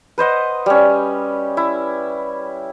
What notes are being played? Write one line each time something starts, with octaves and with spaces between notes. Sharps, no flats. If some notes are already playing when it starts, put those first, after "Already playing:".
B4 C5 D#5 F#5
G3 C#4
E4